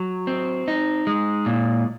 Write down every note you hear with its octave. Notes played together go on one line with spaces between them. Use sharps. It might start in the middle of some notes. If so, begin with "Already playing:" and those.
Already playing: F#3
C4
D#4
G#3
A#2